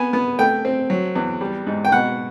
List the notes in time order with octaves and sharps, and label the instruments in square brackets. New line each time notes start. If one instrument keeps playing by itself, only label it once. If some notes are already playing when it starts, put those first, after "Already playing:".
Already playing: [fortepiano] B3 G#5
B3
A3 G5
C4
F#3
E2
G3
G#2
G5
B2 F#5